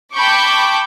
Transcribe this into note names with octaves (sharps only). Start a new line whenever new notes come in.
G5 A5 B5 C#6 D6 G6